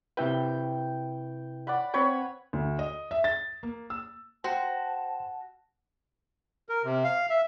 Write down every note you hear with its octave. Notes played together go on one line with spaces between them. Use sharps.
C3 E4 B4 G5
D5 F#5 B5
C4 B4 C#5 G5 B5
D2
D#5
E5
A6
A#3
E6
F#4 C5 G5 A5 C6
A#4
C3
F5
E5